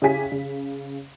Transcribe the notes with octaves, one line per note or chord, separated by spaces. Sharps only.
C#3 E4 G4 C#5 G#5 B6
C#3